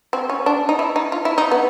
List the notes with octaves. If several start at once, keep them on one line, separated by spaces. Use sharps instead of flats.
C4
C#4
D4
D#4
E4
D#4
F4
E4
D#4
B3